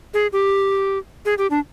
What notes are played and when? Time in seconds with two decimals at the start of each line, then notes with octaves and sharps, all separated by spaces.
0.14 G#4
0.33 G4
1.25 G#4
1.38 G4
1.50 D4